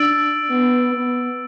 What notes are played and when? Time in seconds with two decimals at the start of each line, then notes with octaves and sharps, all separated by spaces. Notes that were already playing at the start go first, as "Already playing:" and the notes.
Already playing: D4 E6 A6 D7 F#7
0.50 B3
0.94 B3